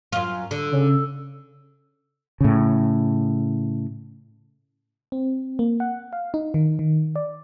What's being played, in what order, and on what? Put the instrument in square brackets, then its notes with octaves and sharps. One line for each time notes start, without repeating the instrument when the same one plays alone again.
[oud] F#2 F4
D3
[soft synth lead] C#3
[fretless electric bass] A2 C#3
[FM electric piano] C4
A#3
F#5
F5
D#4
D#3
D#3
D5